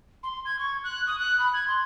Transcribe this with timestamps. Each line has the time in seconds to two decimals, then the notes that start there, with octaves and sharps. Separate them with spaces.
0.23 C6
0.45 G#6
0.59 C#6
0.83 F#6
1.07 D#6
1.19 F#6
1.39 B5
1.53 G#6
1.67 C6